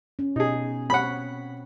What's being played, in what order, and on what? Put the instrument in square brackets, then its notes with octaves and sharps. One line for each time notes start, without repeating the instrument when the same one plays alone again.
[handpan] C#4
[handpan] B2 [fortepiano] D#4 G#4
[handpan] C4 C#5 [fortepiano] F#5 B5